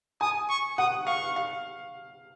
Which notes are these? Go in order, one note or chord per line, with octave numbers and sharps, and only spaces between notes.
G#5 D#6
C#6
F#5 D#6
F5 C#6
F5